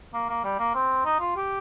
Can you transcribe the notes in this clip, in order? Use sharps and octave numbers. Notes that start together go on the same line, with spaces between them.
A#3
A#3
G3
A#3
C4
D#4
F4
G4